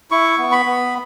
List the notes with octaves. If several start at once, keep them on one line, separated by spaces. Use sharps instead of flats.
E4 C#6
B3
B5
B3